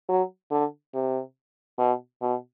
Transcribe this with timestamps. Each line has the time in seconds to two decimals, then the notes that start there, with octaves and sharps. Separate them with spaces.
0.09 F#3
0.51 D3
0.94 C3
1.79 B2
2.22 B2